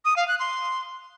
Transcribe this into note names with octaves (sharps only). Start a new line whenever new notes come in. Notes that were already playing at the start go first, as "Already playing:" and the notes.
D#6
F5
F#6
C6